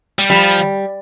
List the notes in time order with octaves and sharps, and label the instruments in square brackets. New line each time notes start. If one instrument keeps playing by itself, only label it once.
[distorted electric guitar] G3
[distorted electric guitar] F3 [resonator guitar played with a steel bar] G3